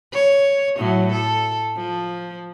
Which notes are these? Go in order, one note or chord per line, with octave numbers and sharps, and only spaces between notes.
C#5
A2 F#3
A4
F3